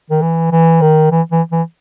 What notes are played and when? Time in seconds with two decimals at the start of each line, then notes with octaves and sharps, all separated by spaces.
0.10 D#3
0.22 E3
0.52 E3
0.81 D#3
1.11 E3
1.32 E3
1.52 E3